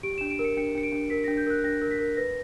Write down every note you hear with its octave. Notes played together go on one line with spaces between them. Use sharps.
G4 D7
D4 E7
D7
A#4
C#7
D4 C#7
D4 C#7
D7
D4
A#4 B6
D4 A#6
G6
A#4 F#6
D4 A#6
A#4
B6
A#4
B4 A#6